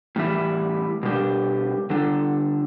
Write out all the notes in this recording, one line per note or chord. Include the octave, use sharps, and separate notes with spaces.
A2 E3 G3 E4
B2 G3 D4 G4
D3 G3 D4 A4